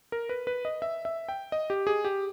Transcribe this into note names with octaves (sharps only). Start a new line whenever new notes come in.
A#4
B4
B4
D#5
E5
E5
G5
D#5
G4
G#4
G4